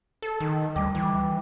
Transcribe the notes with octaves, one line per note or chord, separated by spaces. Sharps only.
A4
D#3
D2 G3 D6
E3